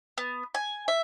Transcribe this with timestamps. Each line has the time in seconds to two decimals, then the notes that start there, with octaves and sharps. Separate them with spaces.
0.18 B3
0.54 G#5
0.88 E5